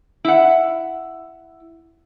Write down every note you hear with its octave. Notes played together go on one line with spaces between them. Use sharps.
E4 F#5